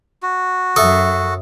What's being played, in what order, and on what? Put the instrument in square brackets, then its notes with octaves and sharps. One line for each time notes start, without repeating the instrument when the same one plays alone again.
[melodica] F#4
[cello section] F#2 [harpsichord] A4 [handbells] E5 D#6